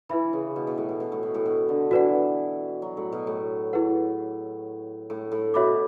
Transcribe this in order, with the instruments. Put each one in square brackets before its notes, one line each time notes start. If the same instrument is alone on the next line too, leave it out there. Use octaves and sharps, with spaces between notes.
[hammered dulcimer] E3 [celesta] E4 B4 E5 B5
[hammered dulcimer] C#3
B2
B2
A2
B2
B2
A2
B2
A2
B2
D3
[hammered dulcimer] E3 [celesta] F#4 B4 D5 F#5
[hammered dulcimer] F#3
A2
B2
A2
[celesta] E4 G#4 B4 F#5
[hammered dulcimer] A2
A2
[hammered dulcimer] B2 [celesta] F#4 C#5 E5 B5 D6